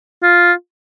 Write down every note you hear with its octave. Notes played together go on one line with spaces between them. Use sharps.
F4